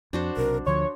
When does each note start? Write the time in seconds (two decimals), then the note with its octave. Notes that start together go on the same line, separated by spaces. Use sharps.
0.13 F2 D4 F#4 C5
0.37 B1 C3 A#4
0.66 D2 D3 F3 C#5 C6